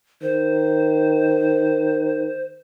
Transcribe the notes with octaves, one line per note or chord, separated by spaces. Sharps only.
D#3 C5